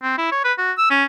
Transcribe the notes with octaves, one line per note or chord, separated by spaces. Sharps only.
C4
E4
C#5
B4
F#4
E6
C#4